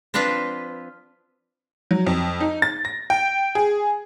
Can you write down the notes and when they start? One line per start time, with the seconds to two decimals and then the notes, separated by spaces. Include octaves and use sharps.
0.14 F3 C4 D4 F4 B4
1.91 F#3
2.06 F2
2.40 D#4
2.62 A6
2.85 A#6
3.10 G5
3.55 G#4